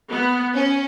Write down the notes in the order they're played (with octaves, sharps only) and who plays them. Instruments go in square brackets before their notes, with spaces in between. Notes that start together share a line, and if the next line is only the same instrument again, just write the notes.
[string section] B3
C#4